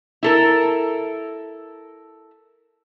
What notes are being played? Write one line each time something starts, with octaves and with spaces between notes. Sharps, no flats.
E4 A4 A#4